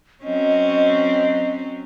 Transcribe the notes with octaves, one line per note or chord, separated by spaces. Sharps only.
F#3 C4 C#4 D#5